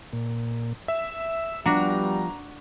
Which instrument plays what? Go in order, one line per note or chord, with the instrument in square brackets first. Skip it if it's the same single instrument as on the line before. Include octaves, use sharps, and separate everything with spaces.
[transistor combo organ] A#2
[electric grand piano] E5 [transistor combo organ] E6
[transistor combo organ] F3 [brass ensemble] G3 B3 [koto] D4 F#4 [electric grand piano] A#5